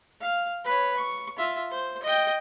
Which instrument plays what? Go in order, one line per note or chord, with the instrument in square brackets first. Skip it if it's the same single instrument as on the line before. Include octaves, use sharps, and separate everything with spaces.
[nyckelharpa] F5
B4 C#5
C#6
F4 E5
C5
D#5 G5